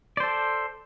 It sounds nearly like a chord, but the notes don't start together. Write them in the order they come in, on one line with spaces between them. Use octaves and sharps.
D5 C5 A4